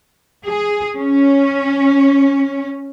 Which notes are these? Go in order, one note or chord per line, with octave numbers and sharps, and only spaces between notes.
G#4
C#4